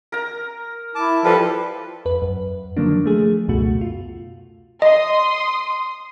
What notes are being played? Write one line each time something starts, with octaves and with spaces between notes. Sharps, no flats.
A#4 A#5
E4 A5 D6
F3 G3 A4 B4
F2 B4
F#2
D3 D#3 F3 F#3 A#3 D4
F3 A3 G#4
C#2 F#2 B2 A3 F#4
F4
D#5 C6 D#6